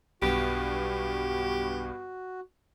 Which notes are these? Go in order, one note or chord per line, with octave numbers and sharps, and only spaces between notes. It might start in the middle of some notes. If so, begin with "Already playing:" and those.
B1 G2 B3 F#4 G4